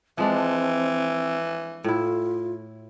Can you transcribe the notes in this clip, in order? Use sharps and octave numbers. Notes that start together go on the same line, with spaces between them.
E3 F3 G#3 C4 D4
A2 E4 F4